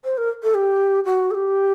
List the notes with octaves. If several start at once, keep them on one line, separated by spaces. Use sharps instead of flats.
C5
A#4
A4
G4
F#4
A4
G4